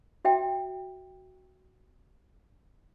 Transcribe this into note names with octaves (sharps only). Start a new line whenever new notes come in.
F#4 E5 G5